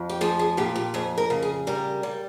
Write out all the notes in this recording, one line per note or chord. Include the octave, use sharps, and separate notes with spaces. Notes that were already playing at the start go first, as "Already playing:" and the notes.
Already playing: F2
G4
F3 G#4
G#4
A#2 G4
G4
F2 G#4
A#4
C#3
G#4
G3 A#4
G3